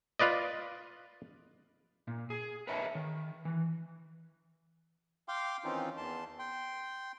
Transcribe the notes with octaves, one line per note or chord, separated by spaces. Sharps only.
F4 B4 D5 D#5
A#2
G#4
A#4 B4 C#5 D#5 E5 A5
D#3
E3
F5 G5 C6 D6
D#3 E3 C4 C#4 D#4 F4
E2 E3 A5 C6
G5 C6